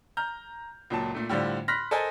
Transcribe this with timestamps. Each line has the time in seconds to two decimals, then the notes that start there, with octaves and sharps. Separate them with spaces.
0.17 A#5 F6 G6
0.90 C#2 A#2 F#3 A5
1.15 A#2 A3
1.29 A2 D3 G3 F4 C5
1.68 B5 C6 F6 F#6 A#6 B6
1.91 A4 A#4 C5 D#5 G#5